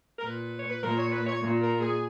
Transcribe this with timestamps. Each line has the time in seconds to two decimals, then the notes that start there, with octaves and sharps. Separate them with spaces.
0.19 A#4
0.23 A#2 B4
0.57 C#5
0.70 B4
0.82 A#2 A#4
0.97 C#5
1.12 B4
1.27 C#5
1.41 A#2
1.61 A#4
1.81 G#4